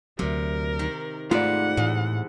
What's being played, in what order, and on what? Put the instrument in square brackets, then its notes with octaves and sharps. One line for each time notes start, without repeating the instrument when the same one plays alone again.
[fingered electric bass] D2 F#3 [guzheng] C3 [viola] A#4
[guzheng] D#3
[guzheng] G#2 G3 [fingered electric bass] A3 [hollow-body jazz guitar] F4 D5 [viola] F#5
[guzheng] E2 [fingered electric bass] A2